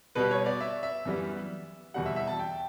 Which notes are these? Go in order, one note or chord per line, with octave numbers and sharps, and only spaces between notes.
B2 G3 B3 B4
C#5
D5
E5
E5
F#2 E3 G3 B3
E2 B2 G3 F#5
E5
E5
A5
G5